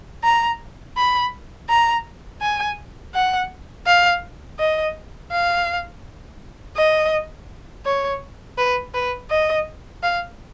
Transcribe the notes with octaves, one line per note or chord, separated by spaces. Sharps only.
A#5
B5
A#5
G#5
F#5
F5
D#5
F5
D#5
C#5
B4
B4
D#5
F5